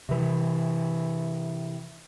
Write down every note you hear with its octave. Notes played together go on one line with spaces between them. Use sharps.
C3 E3